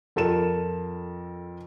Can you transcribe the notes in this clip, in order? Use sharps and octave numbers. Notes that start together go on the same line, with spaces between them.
F2 A4 A#4 E7